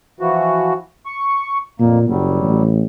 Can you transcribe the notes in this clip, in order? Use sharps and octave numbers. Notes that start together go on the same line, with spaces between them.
E3 F3 F#4
C#6
F2 A#2 A#3
F#1 F#3 G3
A1